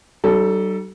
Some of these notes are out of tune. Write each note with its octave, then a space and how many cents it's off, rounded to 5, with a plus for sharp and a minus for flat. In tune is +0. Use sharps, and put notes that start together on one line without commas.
G3 -40 D#4 -25 A4 +0